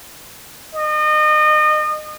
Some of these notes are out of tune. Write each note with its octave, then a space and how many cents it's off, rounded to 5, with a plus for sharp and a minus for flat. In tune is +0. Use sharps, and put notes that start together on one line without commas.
D#5 -30